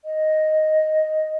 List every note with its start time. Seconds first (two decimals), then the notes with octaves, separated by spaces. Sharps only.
0.05 D#5